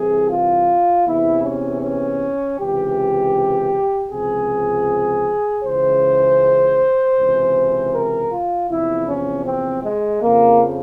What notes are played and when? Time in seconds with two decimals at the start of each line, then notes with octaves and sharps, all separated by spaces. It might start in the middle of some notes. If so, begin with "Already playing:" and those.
Already playing: C2 C3 E3 G#4
0.30 F4
1.06 E2 C3 E3 E4
1.44 C#4
1.83 C#4
2.58 C#2 C3 E3 G4
4.11 C#2 C3 F3 G#4
5.63 C#2 C#3 E3 C5
7.16 C#2 C3 E3
7.93 A#4
8.31 F4
8.69 E2 C3 F3 E4
9.07 C#4
9.46 C4
9.84 G#3
10.22 F2 C#3 F3 A#3